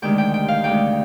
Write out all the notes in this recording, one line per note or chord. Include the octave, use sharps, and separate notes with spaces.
D2 C3 D#3 G#3 G5
G5
G5
F5
D2 C3 D#3 G#3 G5